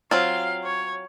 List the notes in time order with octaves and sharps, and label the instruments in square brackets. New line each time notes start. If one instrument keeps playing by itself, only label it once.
[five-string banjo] F#3 C4 F4 [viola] F5
[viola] C#5